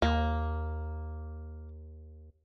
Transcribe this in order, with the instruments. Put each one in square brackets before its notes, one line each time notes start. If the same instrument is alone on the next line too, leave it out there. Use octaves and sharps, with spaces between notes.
[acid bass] D#2 [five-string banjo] A#3